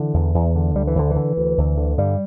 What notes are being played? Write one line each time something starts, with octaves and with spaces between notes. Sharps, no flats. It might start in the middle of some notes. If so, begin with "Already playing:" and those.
Already playing: D3 E3
E2
E2
D3
D2 G3
E3
D2 D3
E3
D3
D2
D2
D3
G2 G3